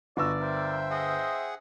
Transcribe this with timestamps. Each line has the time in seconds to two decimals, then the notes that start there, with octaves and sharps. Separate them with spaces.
0.17 G1 F#4 D5 D#5 E6
0.40 A#4 C5 E5 G5
0.91 G#4 D#5 F#5